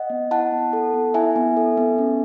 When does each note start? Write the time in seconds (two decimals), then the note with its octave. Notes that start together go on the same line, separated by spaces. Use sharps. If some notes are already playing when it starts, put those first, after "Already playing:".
Already playing: D#5 F#5
0.10 B3
0.31 E4 F#5 A5
0.52 B3
0.73 A4
0.94 B3
1.14 E4 E5 G#5
1.36 B3
1.57 A4
1.77 B3
1.98 C#4